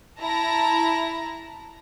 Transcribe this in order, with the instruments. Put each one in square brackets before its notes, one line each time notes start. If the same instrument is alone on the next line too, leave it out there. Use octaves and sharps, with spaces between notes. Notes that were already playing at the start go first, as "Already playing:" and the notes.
[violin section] E4 A5 A#5 A#6